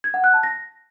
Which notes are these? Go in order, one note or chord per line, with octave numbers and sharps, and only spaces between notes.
G#6
F#5
F#6
A5
A#6